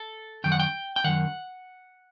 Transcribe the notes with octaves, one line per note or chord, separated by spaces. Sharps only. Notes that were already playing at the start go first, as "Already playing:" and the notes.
Already playing: A4
F#2 D#3 G5
F#5
G5
G5
F#2 D#3 F#5